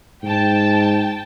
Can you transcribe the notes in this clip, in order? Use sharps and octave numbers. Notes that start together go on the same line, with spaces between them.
G#2 G5 A5